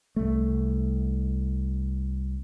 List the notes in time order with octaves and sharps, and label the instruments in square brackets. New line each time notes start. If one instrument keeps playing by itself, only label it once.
[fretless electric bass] C2 A3